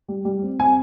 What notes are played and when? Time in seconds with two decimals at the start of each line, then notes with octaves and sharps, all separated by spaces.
0.08 G3
0.25 G3
0.42 C4
0.60 C4 G#5